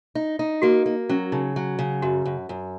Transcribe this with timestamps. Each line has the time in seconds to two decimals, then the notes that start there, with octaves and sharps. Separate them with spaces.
0.15 D#4
0.39 D#4
0.62 A#3 F#4
0.86 A#3
1.09 F#3 C#4
1.32 C#3 D#4
1.56 F#3
1.79 C#3
2.02 F#2 F#4
2.25 F#2
2.49 F#2